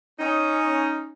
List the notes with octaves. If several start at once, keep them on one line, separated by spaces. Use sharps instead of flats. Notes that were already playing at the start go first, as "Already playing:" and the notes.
C#4 D#4